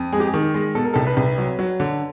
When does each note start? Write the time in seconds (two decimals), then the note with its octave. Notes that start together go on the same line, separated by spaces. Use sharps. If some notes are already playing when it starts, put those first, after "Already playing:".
Already playing: F2
0.12 G#3 G#4
0.20 G4
0.27 G#4
0.34 D#3
0.54 G#3
0.75 B2 A4
0.85 A#4
0.94 C2 A4
1.07 B4
1.17 C2
1.38 F#3
1.59 F#3
1.80 D3